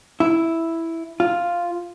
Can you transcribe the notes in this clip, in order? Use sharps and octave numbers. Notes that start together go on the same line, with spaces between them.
E4
F4